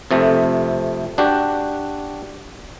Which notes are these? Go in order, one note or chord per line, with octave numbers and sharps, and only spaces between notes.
F2 C3 A3
D4 F#4 G4